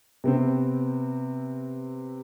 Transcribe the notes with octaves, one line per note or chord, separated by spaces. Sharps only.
C3 B3 C4